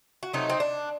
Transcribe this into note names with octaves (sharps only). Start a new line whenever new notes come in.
F#4
C3 F#3 A3 D#4
C4
D4